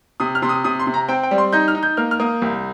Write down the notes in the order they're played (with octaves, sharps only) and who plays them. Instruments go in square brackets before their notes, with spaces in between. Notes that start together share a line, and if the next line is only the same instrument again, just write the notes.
[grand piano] C3 D#6
F6
C3 C6
D#6
C3 D#6
C6
C3
A#5
C4 G5
G5
G3
C6
D#4 G6
F6
D#4
G6
A#3 F6
F6
A#3 D#6
C2